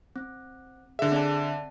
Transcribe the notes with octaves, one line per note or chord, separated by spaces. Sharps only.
C4
D3 G#4 E5
C4 D5 A5